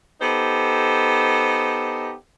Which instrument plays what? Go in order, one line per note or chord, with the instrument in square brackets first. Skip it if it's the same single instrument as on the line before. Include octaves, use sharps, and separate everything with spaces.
[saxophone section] B3 D#4 G4 A4 C5